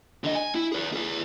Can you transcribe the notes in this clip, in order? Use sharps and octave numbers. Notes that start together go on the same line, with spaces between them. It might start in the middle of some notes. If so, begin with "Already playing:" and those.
D3 D#5
G#5
E4
G#4 B4
G#4 B4